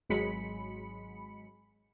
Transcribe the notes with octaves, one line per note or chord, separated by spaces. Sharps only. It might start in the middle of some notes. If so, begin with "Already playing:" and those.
G#1 F#3 G#3 B5 C#7